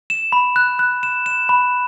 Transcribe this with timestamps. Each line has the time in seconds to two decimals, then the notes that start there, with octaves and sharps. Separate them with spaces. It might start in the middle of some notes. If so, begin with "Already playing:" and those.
0.10 E7
0.32 B5
0.56 F#6
0.79 F#6
1.03 E7
1.26 E7
1.49 B5